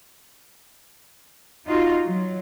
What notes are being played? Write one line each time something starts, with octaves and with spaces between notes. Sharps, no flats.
D#4 F4 F#4
F#3